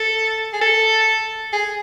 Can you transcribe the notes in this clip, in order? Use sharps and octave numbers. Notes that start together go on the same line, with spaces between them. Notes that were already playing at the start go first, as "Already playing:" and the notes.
Already playing: A4
G#4
A4
G#4